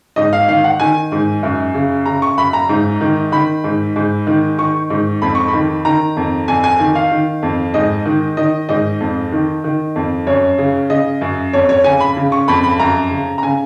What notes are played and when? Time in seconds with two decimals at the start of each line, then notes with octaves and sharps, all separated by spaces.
0.16 G#2 D#5
0.33 F5
0.48 D#3 F5
0.64 F#5
0.80 D#3 G#5
1.12 G#2
1.43 F#2
1.74 C#3
2.06 C#3 A#5
2.22 C#6
2.38 F#2 B5
2.53 A#5
2.69 G#2
3.01 D#3
3.32 D#3 B5
3.64 G#2
3.96 G#2
4.27 D#3
4.59 D#3 C#6
4.90 G#2
5.22 F2 B5
5.35 C#6
5.48 B5
5.53 D#3
5.85 D#3 A#5
6.17 F2
6.48 F2 G#5
6.64 G#5
6.79 D#3 G#5
6.95 F5
7.11 D#3
7.43 F2
7.74 G#2 D#5
8.06 D#3
8.37 D#3 D#5
8.69 G#2 D#5
9.00 F2
9.32 D#3
9.64 D#3
9.96 F2
10.27 F#2 C#5
10.58 C#3
10.90 C#3 D#5
11.21 F#2
11.53 F2 C#5
11.69 C#5
11.84 C#3 G#5
12.00 B5
12.16 C#3
12.32 C#6
12.48 F2 B5
12.63 B5
12.79 F#2 A#5
13.11 C#3
13.38 A#5
13.43 C#3 G#5